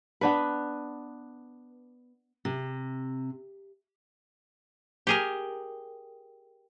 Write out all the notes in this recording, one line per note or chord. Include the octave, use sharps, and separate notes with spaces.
B3 D4 B4
C3
G4 G#4 A#4